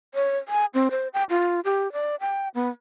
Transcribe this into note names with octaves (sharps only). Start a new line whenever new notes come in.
C#5
G#5
C4
C5
G5
F4
G4
D5
G5
B3